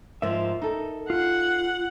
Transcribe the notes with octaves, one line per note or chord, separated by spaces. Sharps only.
G#2 F3 A#4 E5
D#4 A4
F4 F#5